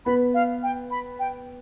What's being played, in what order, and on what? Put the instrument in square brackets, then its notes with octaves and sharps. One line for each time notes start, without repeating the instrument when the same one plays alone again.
[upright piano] B3 [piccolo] B5
[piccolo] F5
G5
B5
G5